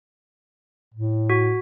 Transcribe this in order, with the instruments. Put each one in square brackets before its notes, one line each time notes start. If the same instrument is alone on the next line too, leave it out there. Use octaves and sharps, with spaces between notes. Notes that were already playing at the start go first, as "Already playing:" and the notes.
[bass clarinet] A2
[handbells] F#4